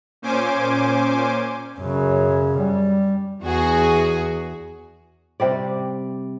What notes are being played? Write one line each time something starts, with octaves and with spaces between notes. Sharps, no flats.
A#2 C#4 C5 G#5 D6
F#2 C#3
G3
E2 F#4 G#4
C3 G3 D5